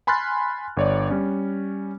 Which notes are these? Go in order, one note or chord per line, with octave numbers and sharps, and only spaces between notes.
G#5 B5 C6 F6 F#6 A6
G1 C#5 D5
G3 C#4